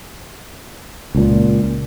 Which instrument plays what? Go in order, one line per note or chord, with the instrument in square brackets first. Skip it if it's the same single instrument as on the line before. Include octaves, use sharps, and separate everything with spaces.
[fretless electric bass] C#2 A#2